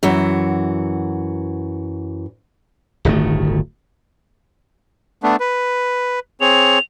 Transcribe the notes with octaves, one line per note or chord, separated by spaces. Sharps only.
F#2 E3 F#4
D1 G1 D#3 A3
A3 B3 D4
B4
C4 G#4 C#5 F7